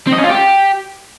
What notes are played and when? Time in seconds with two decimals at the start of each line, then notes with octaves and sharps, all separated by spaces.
0.07 C4
0.13 D#5
0.18 C#4
0.24 F4
0.29 G4